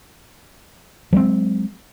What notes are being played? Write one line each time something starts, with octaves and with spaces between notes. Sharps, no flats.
F#3 G#3 A#3 C4